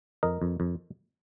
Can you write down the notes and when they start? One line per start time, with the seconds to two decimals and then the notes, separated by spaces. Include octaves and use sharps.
0.23 F2 A#4 D#5
0.42 F2
0.60 F2